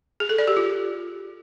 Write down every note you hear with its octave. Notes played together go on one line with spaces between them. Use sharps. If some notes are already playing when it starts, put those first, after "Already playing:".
G#4
A4
D5
G4
F4